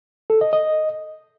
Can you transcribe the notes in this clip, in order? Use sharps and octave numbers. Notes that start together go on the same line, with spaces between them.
A4
D#5
D#5